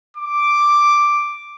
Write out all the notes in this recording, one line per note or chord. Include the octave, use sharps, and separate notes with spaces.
D6